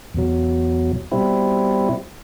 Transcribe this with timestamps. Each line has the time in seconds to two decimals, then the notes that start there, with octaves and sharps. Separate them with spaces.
0.14 E2 B2 F#3
1.12 B2 G3 C4 E4